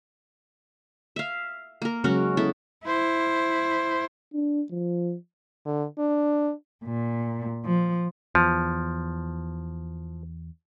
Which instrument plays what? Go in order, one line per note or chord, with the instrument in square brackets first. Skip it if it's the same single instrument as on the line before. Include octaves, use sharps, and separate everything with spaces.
[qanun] E5 F5
A#3 A#4
[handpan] C#3 F#3 G#3 [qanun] C#4 F#4 A#4
[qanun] B3 E4 A4
[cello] E4 C5
[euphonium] D4
F3
[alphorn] D3
D4
[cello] A#2
F3
[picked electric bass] E2 [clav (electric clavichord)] F3